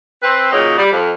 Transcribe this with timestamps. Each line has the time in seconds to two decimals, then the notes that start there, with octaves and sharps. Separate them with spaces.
0.23 C4 B4
0.52 A#2 C#3 F#3 D#4
0.78 G3
0.92 F2